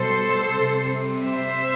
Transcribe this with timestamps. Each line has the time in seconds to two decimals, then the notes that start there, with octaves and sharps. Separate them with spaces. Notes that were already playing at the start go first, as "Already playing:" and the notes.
Already playing: B2 G3 A4 C5
0.58 C3 G3
1.25 C5 E5